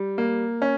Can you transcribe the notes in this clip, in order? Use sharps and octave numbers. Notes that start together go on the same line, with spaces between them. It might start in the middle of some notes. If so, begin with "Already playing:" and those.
Already playing: G3
A#3
C#4